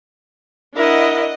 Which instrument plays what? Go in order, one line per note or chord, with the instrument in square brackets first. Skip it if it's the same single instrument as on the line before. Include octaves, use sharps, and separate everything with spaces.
[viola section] D4 D#5 F#5 [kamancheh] E4 A#4